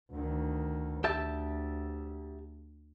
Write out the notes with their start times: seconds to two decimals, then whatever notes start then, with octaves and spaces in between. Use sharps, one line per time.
0.11 D2 D#3
1.04 D2 G4 E5 A5